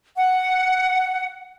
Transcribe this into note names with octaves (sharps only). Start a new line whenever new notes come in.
F#5